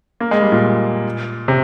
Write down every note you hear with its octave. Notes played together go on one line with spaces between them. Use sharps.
A#3
G#3
G3
A#2
C3